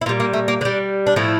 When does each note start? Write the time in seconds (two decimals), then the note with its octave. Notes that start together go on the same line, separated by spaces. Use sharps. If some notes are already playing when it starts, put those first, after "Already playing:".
0.01 E4
0.06 A#2 F4
0.09 G3
0.20 A#3
0.33 A3
0.48 A#3
0.61 D3 G3 D4
1.07 D4
1.16 A2 F3 A3 E4